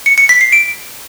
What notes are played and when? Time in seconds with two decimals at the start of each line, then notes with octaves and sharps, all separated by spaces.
0.06 C#7
0.18 C#7
0.29 B6
0.41 C7
0.52 D7